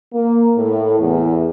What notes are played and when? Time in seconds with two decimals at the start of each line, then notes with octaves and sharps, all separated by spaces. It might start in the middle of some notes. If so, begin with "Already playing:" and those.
0.13 A#3
0.56 A2
0.98 E2